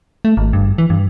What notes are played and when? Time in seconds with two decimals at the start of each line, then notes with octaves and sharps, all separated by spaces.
0.25 A3
0.37 G#1
0.53 G2
0.78 E3
0.90 G2